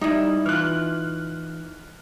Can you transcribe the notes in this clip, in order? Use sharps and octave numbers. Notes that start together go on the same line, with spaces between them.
G3 D#4 E4
E3 F4 F6 F#6